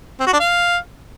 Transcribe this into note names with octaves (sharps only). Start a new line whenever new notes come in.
C4
F#4
D4
F5